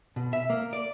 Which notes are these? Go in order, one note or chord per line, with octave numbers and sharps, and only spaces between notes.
B2
E5
A#3
D5